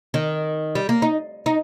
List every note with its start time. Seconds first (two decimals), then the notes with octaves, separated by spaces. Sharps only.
0.14 D#3
0.75 G3
0.89 A#3
1.02 D#4
1.46 D#4